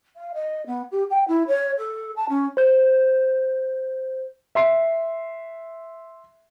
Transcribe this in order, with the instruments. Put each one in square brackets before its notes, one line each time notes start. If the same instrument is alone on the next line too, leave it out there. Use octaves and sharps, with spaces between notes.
[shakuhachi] F5
D#5
B3
G4
G5
E4
C#5
A4
A5
C#4
[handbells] C5 G6
[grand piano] E5 C6 C7